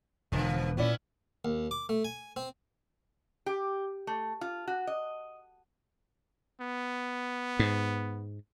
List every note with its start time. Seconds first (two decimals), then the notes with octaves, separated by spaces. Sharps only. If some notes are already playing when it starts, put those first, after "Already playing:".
0.32 E1 B2 D3 F3
0.77 A#2 B3 C#4 E4 D5
1.45 D#2
1.71 D6
1.89 A3
2.05 G#5
2.36 C4
3.46 G4
4.07 A3
4.41 F4
4.67 F#4
4.87 D#5
6.61 B3
7.59 G#2